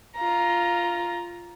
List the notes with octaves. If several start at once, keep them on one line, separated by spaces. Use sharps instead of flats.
F4 A#5